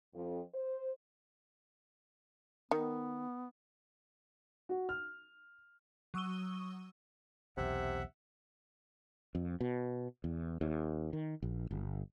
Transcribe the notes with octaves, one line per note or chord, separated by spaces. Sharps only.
F2
C5
D#3 B3
F#4
F6
F#3 C#6 D#6 E6 D#7 G7
B1 E2 C3 E5 F#5
F2
B2
E2
D#2
D#3
A#1
G1